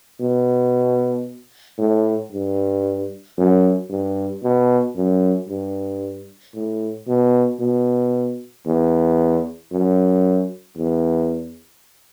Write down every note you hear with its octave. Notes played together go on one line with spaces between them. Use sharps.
B2
A2
G2
F#2
G2
B2
F#2
G2
A2
B2
B2
E2
F#2
E2